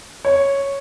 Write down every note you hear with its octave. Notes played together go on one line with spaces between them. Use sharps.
C#5